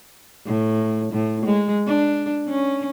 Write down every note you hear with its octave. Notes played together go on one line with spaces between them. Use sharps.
A2
A2
G#3
D4
C#4